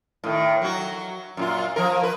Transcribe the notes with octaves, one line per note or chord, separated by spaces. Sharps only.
A2 D#3
F#3 F#4
F#2 A#2 F4
F3 A#4
B4